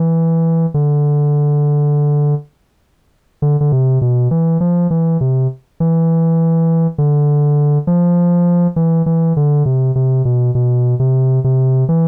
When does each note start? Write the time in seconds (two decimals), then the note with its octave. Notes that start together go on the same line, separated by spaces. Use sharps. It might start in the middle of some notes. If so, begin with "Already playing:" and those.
Already playing: E3
0.74 D3
3.42 D3
3.61 D3
3.72 C3
4.02 B2
4.31 E3
4.60 F3
4.91 E3
5.21 C3
5.80 E3
6.98 D3
7.87 F3
8.76 E3
9.06 E3
9.37 D3
9.66 C3
9.95 C3
10.25 B2
10.55 B2
11.00 C3
11.44 C3
11.89 E3